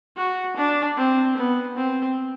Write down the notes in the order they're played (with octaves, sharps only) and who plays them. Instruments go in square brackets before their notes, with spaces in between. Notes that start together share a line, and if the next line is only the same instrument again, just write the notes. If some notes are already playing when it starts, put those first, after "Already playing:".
[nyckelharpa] F#4
D4
C4
B3
C4